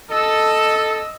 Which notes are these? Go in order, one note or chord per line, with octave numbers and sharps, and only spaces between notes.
A4 D#5 E6